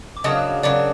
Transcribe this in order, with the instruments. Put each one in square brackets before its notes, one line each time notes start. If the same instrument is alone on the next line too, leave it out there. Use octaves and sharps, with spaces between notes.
[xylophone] D6
[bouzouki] C#3 F#3 A#3 D4 [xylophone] D#5 D#6
[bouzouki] C#3 F#3 A#3 D4 [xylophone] D5 D6